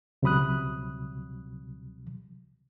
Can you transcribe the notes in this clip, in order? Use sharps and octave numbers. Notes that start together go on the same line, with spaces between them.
C#2 C3 F#3 B5 D#6 F#6